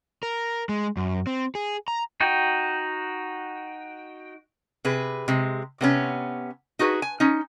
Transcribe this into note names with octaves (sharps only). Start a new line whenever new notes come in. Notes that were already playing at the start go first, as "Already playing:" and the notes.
A#4
G#3
F#2
C4
G#4
A#5
D#4 F#4 G5
C3 G#4 B4
C3 G#3
C3 B3 C#4
D#4 F#4 G#4 B4
G#5
C#4 D#4